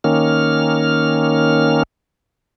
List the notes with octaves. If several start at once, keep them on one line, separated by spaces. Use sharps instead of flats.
D#3 A#3 C#4 F6